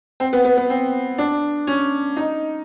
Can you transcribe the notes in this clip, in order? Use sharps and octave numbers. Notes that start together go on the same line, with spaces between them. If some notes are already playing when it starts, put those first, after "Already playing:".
C4
B3
B3
B3
C4
D4
C#4
D#4